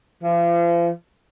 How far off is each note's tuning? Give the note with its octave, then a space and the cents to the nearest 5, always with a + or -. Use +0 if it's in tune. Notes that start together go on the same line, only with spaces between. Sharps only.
F3 -40